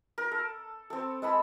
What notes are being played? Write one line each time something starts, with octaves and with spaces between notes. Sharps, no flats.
A#4
A4
C4 A4
G#3 A4 B5 E6